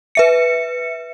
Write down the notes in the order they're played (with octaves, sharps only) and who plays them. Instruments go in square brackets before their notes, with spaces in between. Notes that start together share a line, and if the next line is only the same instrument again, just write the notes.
[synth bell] B4 E5 C#7